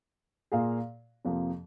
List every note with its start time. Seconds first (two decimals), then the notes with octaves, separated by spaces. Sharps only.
0.52 A#2 A#3 F4 G#4 F5
1.25 F2 C3 F3 A#3